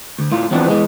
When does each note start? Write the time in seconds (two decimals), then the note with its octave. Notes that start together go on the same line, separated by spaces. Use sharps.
0.19 D2
0.32 A2 F4
0.51 E2 E3 F3 B3 C4 D4
0.68 E2 E3 G#3